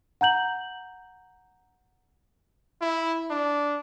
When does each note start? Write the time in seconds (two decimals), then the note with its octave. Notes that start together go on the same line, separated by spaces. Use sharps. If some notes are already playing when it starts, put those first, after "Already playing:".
0.21 F#5 A#5 G6 F#7
2.81 E4
3.30 D4